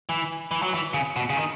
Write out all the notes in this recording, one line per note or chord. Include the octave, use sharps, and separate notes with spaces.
E3
E3
F#3
E3
C#3
B2
C#3
D#3